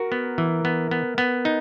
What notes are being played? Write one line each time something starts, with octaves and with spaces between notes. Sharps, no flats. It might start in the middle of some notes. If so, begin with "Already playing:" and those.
Already playing: F#4 A#4
B3
E3
B3
B3
B3
D#4